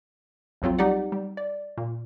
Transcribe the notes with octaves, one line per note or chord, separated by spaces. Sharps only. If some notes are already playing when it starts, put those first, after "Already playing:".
A#1 F2 F#3 C4 F4
G3 D#4 G4 D5 F#5
G3
D5
A#2